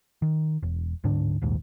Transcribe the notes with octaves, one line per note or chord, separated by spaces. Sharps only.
D#3
E1
D1 G#2 D3 D4
D#1 A#1 D#2 G#2